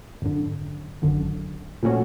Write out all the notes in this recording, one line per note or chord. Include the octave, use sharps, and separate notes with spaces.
G#1 F#2 D3
G#1 F#2 D3
A#2 F3 A3 C#4 F#4